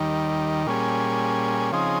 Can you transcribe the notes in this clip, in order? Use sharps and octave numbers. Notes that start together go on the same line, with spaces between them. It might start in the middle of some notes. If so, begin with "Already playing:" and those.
Already playing: D#2 D#3 G3
A#2 G3 C#4 G#4
C#3 F3 C4 D#4 G#4